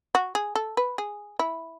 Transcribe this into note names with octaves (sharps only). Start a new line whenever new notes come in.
F#4
G#4
A4
B4
G#4
E4